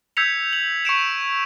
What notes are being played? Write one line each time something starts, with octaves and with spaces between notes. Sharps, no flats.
E6 G6 G#6 B6 C#7 F7
F#7
C#6 C#7 D7 E7